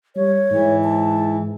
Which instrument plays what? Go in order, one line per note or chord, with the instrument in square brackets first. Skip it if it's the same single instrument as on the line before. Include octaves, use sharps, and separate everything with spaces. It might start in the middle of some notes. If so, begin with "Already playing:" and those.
[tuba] G3 [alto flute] C#5
[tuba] G#2 [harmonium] E3
[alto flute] A5